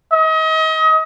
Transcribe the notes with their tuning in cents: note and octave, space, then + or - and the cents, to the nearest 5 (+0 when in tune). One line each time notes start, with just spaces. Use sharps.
D#5 +35